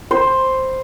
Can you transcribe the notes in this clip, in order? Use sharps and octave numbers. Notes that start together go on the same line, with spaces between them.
C5